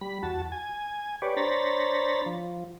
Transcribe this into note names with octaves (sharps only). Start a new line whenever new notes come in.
G3 B5
E2 F#4 A5
G#5
G4 B4 C#5 D5
D4 C5 C#5 A#5 B5 A6
F3